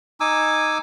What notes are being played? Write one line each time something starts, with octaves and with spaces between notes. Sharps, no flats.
D#4 G#5 D6 E6